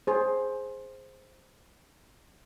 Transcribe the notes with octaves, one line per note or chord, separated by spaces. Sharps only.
G#4 C5